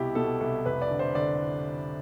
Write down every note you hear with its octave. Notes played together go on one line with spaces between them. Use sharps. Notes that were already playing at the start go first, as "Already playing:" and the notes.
Already playing: C2 B2 E4 G4
B2 A4
C2 A4
F1 B4
D5
D3
C5
D3 D5